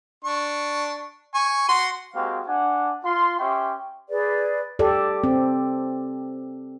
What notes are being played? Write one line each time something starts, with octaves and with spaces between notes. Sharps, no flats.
D4 C#6
G#5 C#6
F#4 C6
G#3 A#3 C4 F#4 G4 F5
D4 F#5 G#5
F4 C6
C#4 G4 E5 G5 C6 C#6
G#4 B4 D5
G4 A4 D5
C4